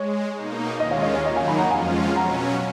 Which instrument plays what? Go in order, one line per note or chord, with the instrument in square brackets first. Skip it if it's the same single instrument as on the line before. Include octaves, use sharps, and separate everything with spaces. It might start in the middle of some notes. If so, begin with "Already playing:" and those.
Already playing: [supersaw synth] G#3 [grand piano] C#5
[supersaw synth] B2 A#3 D#4
[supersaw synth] D#2 D#3 G#3 C#4 F4 [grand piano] D#5
[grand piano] C#5 F5
D#5
C#5
[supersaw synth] D#3 F#3 A#3 D#4 [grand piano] D#5
[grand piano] F5 G#5
G#5 B5
F#5 A#5
[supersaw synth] F2 F3 G#3 C#4 F4 [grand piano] F5 G#5
[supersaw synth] B2 F#3 C#4 [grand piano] F#5 A#5